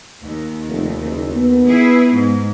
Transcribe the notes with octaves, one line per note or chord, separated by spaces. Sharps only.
D#2
F1
F#1
B3
E4 G#4 B4
G#2